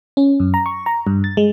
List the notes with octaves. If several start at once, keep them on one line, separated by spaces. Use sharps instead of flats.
C#4
F#2
A#5
C#6
A#5
G2
A6
G#3